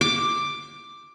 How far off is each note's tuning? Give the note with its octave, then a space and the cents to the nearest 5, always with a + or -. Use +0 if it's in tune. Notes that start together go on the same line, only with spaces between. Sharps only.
D6 +5